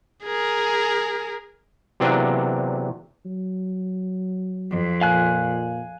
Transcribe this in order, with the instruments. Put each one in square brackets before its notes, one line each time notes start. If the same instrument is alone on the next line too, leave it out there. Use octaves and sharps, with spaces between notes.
[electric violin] G#4 A#4
[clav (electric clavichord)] E2 C3 F#3 A#3 D4
[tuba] F#3
[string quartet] F2
[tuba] A#2 [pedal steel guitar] F5 G#5 F#6